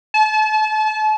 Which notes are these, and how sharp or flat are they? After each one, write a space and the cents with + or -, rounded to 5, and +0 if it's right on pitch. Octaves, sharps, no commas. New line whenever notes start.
A5 -35